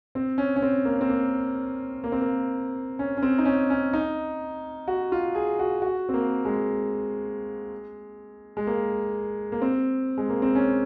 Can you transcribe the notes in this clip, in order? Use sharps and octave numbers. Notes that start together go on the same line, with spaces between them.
C4
C#4
C#4
C4
A#3
C4
A#3
A#3
C4
A#3
C#4
C#4
C4
D#4
C#4
C#4
D#4
F#4
F4
G#4
F#4
F#4
C4
A#3
G#3
G#3
A#3
A#3
C4
G#3
A#3
C4
C#4